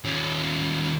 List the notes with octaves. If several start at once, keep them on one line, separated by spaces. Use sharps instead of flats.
D#2 C#4